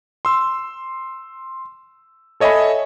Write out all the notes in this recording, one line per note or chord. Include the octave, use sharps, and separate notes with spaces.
C6 E6
A4 C#5 D#5 E5 G#5 B5